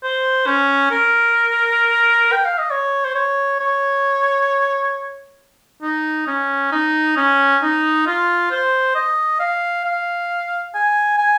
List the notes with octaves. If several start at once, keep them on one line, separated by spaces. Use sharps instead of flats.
C5
C#4
A#4
G5
F5
D#5
C#5
C5
C#5
C#5
D#4
C#4
D#4
C#4
D#4
F4
C5
D#5
F5
F5
G#5
G#5